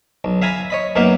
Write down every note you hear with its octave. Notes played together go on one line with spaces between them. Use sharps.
B1
E5 F5 G#5 A#5 B5
C#5 D#5 B5
F#2 A#3 B3 D#4 E5 F5